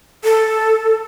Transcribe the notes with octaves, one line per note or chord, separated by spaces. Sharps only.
A4